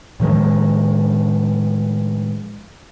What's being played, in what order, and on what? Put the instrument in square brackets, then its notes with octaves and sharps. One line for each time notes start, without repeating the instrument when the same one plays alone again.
[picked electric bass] A2 D#3 F3 G#3